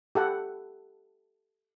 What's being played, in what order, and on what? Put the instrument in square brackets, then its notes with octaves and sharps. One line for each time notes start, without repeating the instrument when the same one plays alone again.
[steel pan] G4 A4 F#5